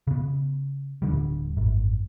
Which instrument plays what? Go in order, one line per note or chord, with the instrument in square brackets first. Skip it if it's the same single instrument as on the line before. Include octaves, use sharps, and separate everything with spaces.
[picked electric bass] C#3 B3
D1 D3 G3
G#1 F#2